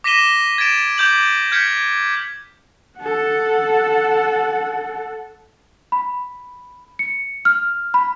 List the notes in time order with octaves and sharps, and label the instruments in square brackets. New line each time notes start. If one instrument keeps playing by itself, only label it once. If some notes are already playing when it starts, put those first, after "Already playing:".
[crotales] D6 A#6 B6 D#7 E7 G7
G#6 A6 D7 E7
D6 G6 F#7
F6 G6 G#6 B6 C#7
[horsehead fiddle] A4 F#5
[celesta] B5
C#7
F6
B5